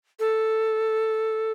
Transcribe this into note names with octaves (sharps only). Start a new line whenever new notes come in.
A4